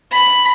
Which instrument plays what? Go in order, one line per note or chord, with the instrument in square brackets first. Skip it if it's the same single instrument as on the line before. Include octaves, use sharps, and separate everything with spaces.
[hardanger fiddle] B5